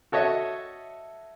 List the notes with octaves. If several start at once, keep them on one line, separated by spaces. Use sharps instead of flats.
F#4 A4 C#5 D#5 E5